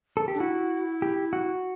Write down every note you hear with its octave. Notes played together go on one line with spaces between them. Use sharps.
A4
G4
D4
E4 F#4
G4
F#4